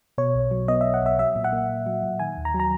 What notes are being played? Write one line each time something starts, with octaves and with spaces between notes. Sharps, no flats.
B2 C#5
B1
F#3
B3 D#5
B2 E5
F#5
B1 E5
F#3 E5
A#2
F#5
A#3
A#2
F#3
A#2
D#3 G#5
D#2
A#5
F#3
A#5